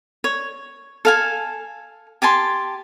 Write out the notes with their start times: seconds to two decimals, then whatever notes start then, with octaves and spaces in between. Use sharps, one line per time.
0.24 C#5
1.05 A4 F5 G#5
2.22 G4 G#5 A5 C6